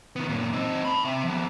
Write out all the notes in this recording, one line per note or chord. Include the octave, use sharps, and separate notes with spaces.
D#3 B3
F#2 A#2
C4 D#4
A5 B5
C4 E5
F3 B3